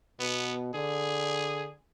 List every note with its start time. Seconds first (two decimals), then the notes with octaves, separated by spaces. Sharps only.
0.20 B2 B3
0.74 D3 G#4